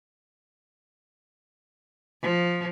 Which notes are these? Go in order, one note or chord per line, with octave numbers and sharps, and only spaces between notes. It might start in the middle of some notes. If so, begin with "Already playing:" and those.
F3